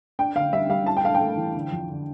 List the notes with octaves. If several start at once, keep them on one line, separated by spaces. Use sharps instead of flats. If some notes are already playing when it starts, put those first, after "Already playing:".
D4 G5
D3 F5
G3 E5
G3 F5
E4 A5
G5
A3 F5
G5
A3
E3
D3
F2
D3